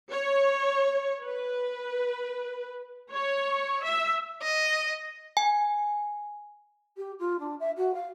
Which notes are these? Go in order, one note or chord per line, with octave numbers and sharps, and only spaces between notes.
C#5
B4
C#5
E5
D#5
G#5
G4
F4
D4
E5
F#4
F5